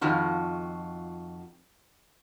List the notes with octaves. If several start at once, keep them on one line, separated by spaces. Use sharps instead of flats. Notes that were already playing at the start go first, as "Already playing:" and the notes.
F2 D#3 F4 F#4